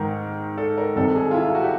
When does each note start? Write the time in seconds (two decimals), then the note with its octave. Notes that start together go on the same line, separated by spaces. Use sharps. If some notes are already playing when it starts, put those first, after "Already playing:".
Already playing: G#2 D#3 A#4
0.58 A4
0.78 A#4
0.96 C2 C3 D#3 A4
1.16 G#4
1.31 F4
1.34 E4
1.45 F4
1.55 F#4
1.64 G4